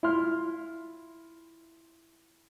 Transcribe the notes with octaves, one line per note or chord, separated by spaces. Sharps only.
E4 F4 C6 F6